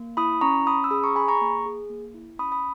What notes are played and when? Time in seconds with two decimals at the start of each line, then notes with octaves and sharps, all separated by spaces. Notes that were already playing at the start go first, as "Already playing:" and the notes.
Already playing: A#3
0.17 E4 B5 D#6
0.41 C#4 A#5 C#6
0.66 C#4 B5 D#6
0.84 E6
0.91 G#4 B5 D#6
1.04 A#5 C#6
1.16 G#4 G#5 B5
1.28 A#5 C#6
1.41 A#3
1.66 G#4
1.90 A#3
2.14 E4
2.39 C#4 B5 D#6
2.52 B5 D#6